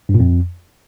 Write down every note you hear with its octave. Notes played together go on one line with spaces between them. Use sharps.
G2
A#2
F2